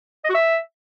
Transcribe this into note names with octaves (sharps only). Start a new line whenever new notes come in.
D#5
F#4
E5